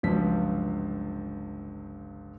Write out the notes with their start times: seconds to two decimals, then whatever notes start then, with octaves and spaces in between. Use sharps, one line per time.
0.03 G1 C#2 F3 F#3 B6